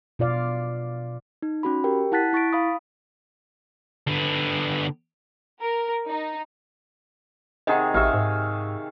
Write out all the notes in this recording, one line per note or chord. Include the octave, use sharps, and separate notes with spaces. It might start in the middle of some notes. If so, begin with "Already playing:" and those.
B2 F4 D5 F5
D#4
C#4 F#4 B5
G4 A#4 G5
E4 F#5 A5 F#6 A6 B6
E4 C#6 A6 B6 D7
F5 B5 D#6
D3 B3
A#4
D#4
C3 D#3 G#4 C5 D#5 F#5 G5
A1 F#4 G4 E5 F5 C#6 E6
G#2